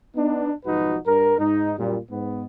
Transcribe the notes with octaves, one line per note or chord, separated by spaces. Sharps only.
B3 D4 D#4
B1 G#2 F3 D#4 F#4 B4
G2 A#4
G#2 D#4
F#2 A#2 G3
G#2 B3